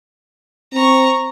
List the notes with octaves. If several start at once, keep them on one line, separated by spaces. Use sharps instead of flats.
C4 A#5 C#6